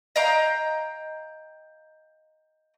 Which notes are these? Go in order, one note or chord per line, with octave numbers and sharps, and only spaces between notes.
D#5 F5 G5 A#5